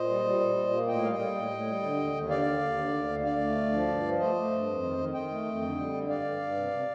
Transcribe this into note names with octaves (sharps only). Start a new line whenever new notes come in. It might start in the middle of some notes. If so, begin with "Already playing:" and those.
Already playing: A#2 C5 D#5
G3
G3
A#2
A#2
A#3
A2 D#5 G5
G3 F5
D#5 G5
G3
A2
A2
G3
D3
D#2
D#2
D3 D5 F5
D#2
D#2
D3
D2
D3
D2 D5 F5
A3
D2
F3
G2
F3
A3 C5 D#5
A3
G2
F2
D#3
D#3
D#3 D#5 G5
A3
F2
D3
G3
D3
G2 D5 F5
G2
G2
C3
C3